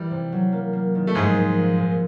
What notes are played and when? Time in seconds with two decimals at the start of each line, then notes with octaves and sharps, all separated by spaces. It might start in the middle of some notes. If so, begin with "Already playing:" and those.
Already playing: E3 G3
0.11 C3
0.32 F#3
0.53 A#3
0.73 A#3
0.95 D#3
1.07 A3
1.15 G#2 F3 G#3
1.35 A#2
1.57 F3
1.77 A#2